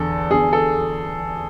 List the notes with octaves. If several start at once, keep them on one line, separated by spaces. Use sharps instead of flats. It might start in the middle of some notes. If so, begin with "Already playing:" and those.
Already playing: E2 D3 A4
E2 D3 G#4
A4